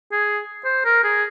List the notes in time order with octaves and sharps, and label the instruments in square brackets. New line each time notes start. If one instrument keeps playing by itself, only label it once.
[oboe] G#4
C5
A#4
G#4